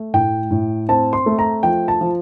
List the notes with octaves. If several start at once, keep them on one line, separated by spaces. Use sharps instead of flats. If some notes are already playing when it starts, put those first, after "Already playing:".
Already playing: A3
A2 G5
A2
C4 A5
C6
A3
A#5
F3 G5
A5
F3